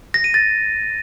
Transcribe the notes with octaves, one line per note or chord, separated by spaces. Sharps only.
A#6
D#7
A6